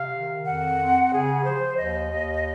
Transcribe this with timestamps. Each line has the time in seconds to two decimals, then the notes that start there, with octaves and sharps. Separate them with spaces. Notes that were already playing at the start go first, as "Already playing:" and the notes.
Already playing: C3 F5
0.13 D#3
0.45 F2 F#5
0.78 C4
1.11 C#3 G#4
1.44 F3 C5
1.77 D#2 D#5
2.10 D#2